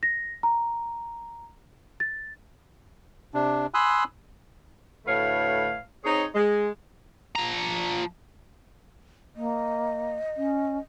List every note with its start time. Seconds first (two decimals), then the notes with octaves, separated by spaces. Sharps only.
0.03 A#6
0.43 A#5
2.00 A6
3.34 C3 D4
3.74 G#5 B5 C6 D#6 E6 F#6
5.06 D2 A2 A3 B4 C#5 F5
6.04 C4 D#4 G#4 C#5
6.35 G#3
7.36 F3 A#5
9.36 A#3 D#5
10.37 C#4